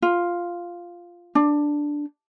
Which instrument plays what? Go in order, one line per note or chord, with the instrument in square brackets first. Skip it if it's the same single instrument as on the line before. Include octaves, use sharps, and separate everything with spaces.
[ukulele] F4
D4